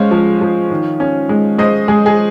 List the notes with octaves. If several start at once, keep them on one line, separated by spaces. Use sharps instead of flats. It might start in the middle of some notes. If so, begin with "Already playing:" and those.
Already playing: G#3 C#4 C5 C#5 F5
F3
F3
D#3
C#4
G#3
G#3 C5 D#5
G#3 G#4
G#4